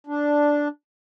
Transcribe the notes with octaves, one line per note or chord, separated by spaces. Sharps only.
D4